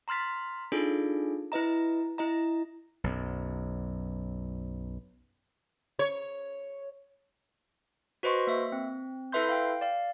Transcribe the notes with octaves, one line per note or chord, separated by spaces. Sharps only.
A#5 C6 F6 A6 B6
D4 D#4 F4 G#4 A4
E4 B4 D#5 A#5
E4 D#5 A#5
B1 F#2
C#5
F#4 B4 C5 D#5 C6 C#6
A#3 E5
C4
E4 A4 B4 E5 C6 G6
F5 G5
D5 F5